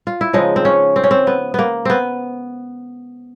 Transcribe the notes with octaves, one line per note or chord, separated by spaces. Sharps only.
F4
E4
C#3 F3 G#3 D#4
C4
C#4
C4
C#4
C4
B3
A#3 B3
B3 C4